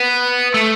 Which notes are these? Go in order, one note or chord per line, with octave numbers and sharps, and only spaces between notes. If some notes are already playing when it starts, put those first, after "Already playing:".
Already playing: B3
A3